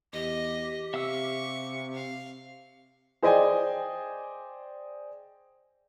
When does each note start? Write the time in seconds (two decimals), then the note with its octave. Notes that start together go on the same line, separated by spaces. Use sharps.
0.13 E2 G4 D#5
0.94 C3 E5 F5 C#6 E6
1.94 F5
3.23 G#4 C5 D5 D#5 G5 G#5